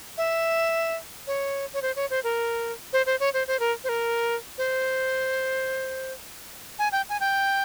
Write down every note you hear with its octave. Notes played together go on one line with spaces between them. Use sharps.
E5
C#5
C#5
C5
C#5
C5
A#4
C5
C5
C#5
C5
C5
A#4
C5
A#4
C5
G#5
G5
G#5
G5